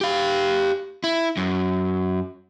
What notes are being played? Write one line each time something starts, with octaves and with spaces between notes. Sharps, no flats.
G4 F5
E4
F#2